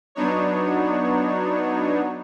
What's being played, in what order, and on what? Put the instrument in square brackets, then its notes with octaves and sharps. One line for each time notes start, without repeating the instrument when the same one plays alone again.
[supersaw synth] F#3 B3 D4 D#4 C#5